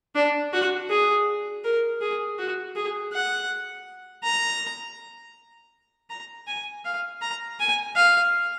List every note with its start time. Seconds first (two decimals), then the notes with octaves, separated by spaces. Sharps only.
0.15 D4
0.53 F#4
0.90 G#4
1.64 A#4
2.01 G#4
2.38 F#4
2.75 G#4
3.13 F#5
4.24 A#5
6.10 A#5
6.47 G#5
6.85 F5
7.21 A#5
7.59 G#5
7.96 F5